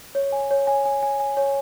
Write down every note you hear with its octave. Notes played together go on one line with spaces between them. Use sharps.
C#5
G#5
C#5
G#5
G#5
G#5
G#5
C#5